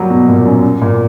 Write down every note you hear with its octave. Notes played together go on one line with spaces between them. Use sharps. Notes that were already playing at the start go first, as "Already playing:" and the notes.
Already playing: F#3 G3 A#3
B2
A#2
F#2
A#2